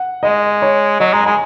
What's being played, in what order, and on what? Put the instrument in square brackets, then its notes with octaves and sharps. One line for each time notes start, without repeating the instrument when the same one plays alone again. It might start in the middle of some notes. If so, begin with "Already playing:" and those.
Already playing: [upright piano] F#5
[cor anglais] G#3 [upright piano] D#5
[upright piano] C#5
[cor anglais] F#3 [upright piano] D#5
[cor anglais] G#3 [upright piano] A#5
[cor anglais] G#3 [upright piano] G#5